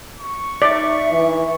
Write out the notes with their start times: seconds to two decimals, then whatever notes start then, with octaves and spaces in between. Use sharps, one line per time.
0.19 C#6
0.62 D#4 D5 E5
1.11 E3